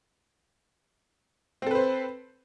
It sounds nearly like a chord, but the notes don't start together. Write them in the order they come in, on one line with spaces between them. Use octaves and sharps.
C4 A4 B4 C5